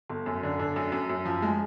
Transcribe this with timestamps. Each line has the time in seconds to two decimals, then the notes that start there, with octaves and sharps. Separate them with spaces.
0.10 G1
0.26 F#2
0.43 D3
0.59 D3
0.76 F#2
0.92 F#2
1.09 F#2
1.25 F3
1.42 G#3